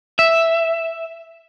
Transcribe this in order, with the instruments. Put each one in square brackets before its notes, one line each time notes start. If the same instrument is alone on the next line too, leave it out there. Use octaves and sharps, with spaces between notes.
[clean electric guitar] E5